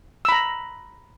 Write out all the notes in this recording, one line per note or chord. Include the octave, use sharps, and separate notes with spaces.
A#5 B5 E6